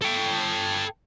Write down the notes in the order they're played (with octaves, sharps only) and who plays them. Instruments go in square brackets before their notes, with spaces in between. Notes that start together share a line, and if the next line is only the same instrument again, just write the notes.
[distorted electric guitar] A4 G5